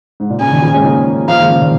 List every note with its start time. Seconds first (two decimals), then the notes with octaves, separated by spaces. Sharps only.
0.20 G#2
0.30 A#2
0.41 C#3 G#5
0.52 A#2 D#3
0.62 C#3 F3
0.74 G#3 C#4
0.85 A#3 D#4
1.28 F3 A#3 F5
1.39 D#3 G#3
1.50 C#3 F3
1.61 A#2 D#3